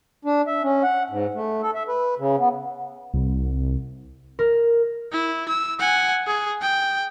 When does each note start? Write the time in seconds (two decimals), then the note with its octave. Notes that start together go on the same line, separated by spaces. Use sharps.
0.25 D4
0.47 E5
0.63 C#4
0.83 F#5
1.10 G#2
1.34 A3
1.62 A4
1.74 E5
1.89 B4
2.19 C#3
2.39 B3
3.14 C2
4.39 A#4
5.12 E4
5.49 E6
5.79 F#5 G#5
6.26 G#4
6.62 G5